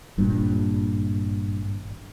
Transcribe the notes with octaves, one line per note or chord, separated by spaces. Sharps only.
G#1 G2 A#2